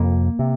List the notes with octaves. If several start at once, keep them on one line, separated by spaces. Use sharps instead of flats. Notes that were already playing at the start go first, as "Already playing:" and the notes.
Already playing: F2 C3 A#3
C3